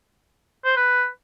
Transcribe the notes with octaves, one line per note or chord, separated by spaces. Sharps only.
C5
B4